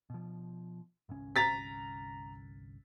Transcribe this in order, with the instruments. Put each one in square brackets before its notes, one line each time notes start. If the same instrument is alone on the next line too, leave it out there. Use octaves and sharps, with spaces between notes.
[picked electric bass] B2 F3
G1 C2 C#4
[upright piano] A#5 A6 B6